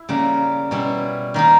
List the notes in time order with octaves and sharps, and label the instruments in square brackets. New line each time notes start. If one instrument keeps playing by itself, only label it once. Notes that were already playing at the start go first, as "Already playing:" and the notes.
Already playing: [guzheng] E4
C#3 G3 A#3
B2 G3 C#4 E4
D#3 A#3 D#4